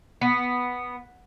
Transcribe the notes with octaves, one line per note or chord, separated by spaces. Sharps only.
B3